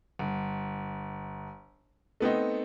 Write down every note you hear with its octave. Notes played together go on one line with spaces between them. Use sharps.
G1
A3 B3 C4 D#4